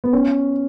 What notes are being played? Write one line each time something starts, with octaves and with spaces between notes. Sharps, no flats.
B3
C#4